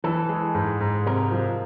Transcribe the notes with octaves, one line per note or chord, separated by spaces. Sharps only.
E3 A4
G#3
G#2
G#2
C3 A#4
F3